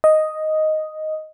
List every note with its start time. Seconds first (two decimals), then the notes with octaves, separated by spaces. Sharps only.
0.04 D#5